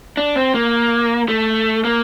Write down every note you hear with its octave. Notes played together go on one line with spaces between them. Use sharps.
D4
C4
A#3
A3
A#3